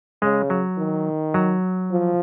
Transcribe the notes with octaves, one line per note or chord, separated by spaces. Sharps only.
C#3 G#3
F#3
D#3
F#3
F3